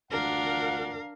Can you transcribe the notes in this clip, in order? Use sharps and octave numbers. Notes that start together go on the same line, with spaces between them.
D2 D4 F4 A#4 F5 F#5